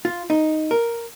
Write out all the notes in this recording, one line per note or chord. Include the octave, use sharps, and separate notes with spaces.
F4
D#4
A#4